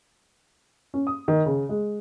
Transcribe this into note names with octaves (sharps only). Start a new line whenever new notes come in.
C#4
D#6
D#3
C#3
G#3